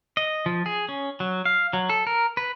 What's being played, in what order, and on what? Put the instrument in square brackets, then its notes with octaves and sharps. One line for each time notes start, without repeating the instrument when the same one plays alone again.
[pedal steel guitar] D#5
F3
G#4
C#4
F#3
F5
F#3
A4
A#4
B4